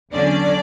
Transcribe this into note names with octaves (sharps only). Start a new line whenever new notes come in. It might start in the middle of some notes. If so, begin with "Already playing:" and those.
E2 D3 F#3 C#4 D4 D5